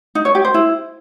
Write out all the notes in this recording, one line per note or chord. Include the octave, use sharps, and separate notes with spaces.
D#4
C#5
G4
C5
E4